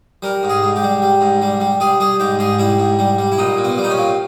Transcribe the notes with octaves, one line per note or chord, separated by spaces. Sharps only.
G3 A#4
G#2
G#4
G#2
G4
G3
G3
G#2
G3
G3
G3 G#4
G3 G#4
G#2 G4
G#2 G#4
G3 E4
G#2
G3
G3
E4
A#2 D#4
A#2
B3
G3
D#4
C#4
A#2